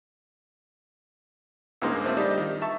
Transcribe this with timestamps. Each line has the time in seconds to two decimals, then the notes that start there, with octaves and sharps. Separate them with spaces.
1.82 C#2 G2 G#3 A#3 D#4 C5
2.05 A3 C4 F4 E5
2.17 G3 D4 D#4 D#5
2.38 D#3
2.62 E5 A5 C#6